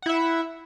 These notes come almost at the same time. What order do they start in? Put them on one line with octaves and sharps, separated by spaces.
F#5 E4 E5